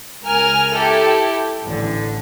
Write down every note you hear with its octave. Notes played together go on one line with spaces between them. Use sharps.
C#2 A#4 G#5 F6
E4 G4 A4
A1 D3